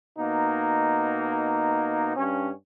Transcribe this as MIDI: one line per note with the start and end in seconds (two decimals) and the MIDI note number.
0.17 2.13 47
0.17 2.13 58
0.17 2.13 63
2.15 2.49 43
2.15 2.49 61